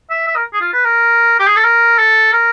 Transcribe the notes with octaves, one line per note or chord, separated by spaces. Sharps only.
E5
E5
A#4
G#4
F4
B4
A#4
G4
G#4
A4
A#4
A4
A#4